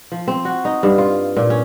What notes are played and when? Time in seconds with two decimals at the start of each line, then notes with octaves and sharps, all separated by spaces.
0.12 F3
0.28 C4
0.45 F#4
0.65 D#4
0.83 G2
0.98 F4
1.37 A#2
1.50 C#4